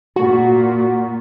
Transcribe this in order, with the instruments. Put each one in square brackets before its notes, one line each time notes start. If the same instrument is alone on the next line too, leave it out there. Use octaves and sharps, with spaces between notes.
[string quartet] A#2 [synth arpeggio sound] F#4